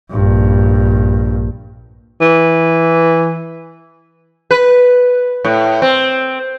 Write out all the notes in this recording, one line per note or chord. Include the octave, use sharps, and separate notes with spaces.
A#1 G2
E3
B4
A2
C4